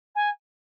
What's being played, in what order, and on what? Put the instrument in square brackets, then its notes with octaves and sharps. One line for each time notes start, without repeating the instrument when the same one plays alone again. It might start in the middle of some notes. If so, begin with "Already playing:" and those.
[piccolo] G#5